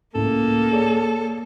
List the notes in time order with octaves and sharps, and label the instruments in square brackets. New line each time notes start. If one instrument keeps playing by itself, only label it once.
[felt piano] C#2 A2 [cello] A#3 [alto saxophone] A4
[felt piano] G#4 C#5 D5